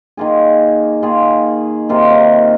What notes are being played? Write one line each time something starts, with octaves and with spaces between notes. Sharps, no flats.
D#3 A#3 F4 G#4
D#3 A#3 F4 G#4
C3 D#3 A#3 F4